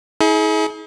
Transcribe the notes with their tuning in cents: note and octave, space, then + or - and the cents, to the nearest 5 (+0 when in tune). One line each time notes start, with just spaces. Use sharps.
E4 -45 G#4 +35